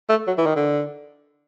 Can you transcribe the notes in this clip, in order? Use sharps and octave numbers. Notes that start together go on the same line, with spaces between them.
A3
F#3
E3
D#3
D3